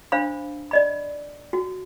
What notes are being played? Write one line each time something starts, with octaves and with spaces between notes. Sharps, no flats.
D4 C5 F5 B5
D5 D#5 B5
F#4